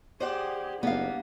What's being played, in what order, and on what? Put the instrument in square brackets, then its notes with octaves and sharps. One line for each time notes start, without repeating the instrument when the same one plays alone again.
[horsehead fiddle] G4 G#4 [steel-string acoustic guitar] C5 D5 F#5
[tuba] F#1 [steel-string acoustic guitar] G3 [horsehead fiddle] A#3 D4 [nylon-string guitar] B3 F5